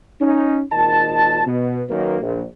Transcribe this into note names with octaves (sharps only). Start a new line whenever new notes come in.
C#4 D#4
G#1 A#2 D#3 D#5 A5
B2
F#2 D#3 A#3 B4
A#1